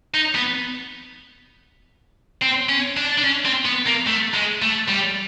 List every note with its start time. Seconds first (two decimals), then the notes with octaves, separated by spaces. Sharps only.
0.14 D#4
0.35 B3
2.42 C4
2.69 C#4
2.97 D4
3.18 D4
3.24 C#4
3.45 C4
3.65 B3
3.86 A#3
4.06 A3
4.34 G#3
4.62 A3
4.89 G3